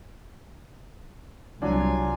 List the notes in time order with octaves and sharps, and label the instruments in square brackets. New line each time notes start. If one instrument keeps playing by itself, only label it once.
[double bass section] C2 [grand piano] F#3 D4 [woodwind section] F4 G#5